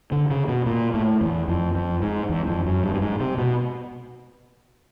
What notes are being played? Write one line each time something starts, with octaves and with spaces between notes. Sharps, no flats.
D3
C#3
B2
A#2
A2
E2
F2
F2
G#2
E2
F2
F#2
G2
G2
G#2
C3
B2